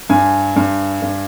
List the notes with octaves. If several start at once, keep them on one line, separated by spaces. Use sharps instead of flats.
G2 G#5
G2
G2